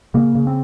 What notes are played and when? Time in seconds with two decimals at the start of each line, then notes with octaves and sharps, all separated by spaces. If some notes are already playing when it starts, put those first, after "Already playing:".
0.14 C#3 A#3
0.35 C#3
0.47 C4